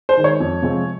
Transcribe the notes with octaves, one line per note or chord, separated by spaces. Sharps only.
C5
D#3 G#3
C#5
F2
C3 F3 G#3 C4